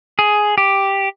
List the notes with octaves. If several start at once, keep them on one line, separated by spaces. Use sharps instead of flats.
G#4
G4